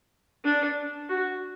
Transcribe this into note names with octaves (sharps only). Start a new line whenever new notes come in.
D4
F#4